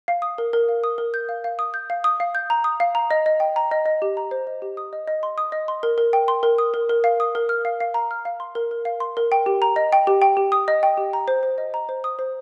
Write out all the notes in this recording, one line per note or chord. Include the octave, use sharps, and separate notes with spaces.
F5
D#6
A#4
A#4
F5
D#6
A#4
G6
F5
F5
D#6
G6
F5
D#6
F5
G6
A#5
D#6
F5
A#5
D#5
D#5
G5
A#5
D#5
D#5
G4
A#5
C5
D#5
G4
D#6
D#5
D#5
C6
D#6
D#5
C6
A#4
A#4
G5
C6
A#4
D#6
A#4
A#4
F5
D#6
A#4
F6
F5
F5
A#5
F6
F5
C6
A#4
A#4
F5
C6
A#4
G5
G4
A#5
D#5
G5
G4
G5
G4
D#6
D#5
G5
G4
A#5
C5
C5
D#5
A#5
C5
D#6
C5